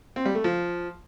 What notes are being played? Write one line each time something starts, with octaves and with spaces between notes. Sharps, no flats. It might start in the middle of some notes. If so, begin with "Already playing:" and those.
C4
G3
A3
F3